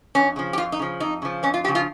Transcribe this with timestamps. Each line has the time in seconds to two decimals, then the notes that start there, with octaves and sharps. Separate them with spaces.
0.15 F2 C#4
0.36 C#3 F3
0.53 G4
0.58 F2 F4
0.72 D#4
0.79 C#3 F3
1.00 F2 D#4
1.22 C#3 F3
1.43 F2 C#4
1.54 F4
1.64 F3 G4
1.68 C#3
1.75 F4